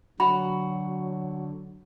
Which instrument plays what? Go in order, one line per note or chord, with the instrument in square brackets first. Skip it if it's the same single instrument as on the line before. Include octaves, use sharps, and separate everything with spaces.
[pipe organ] D3 [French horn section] F#3 [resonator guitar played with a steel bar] F#4 [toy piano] B5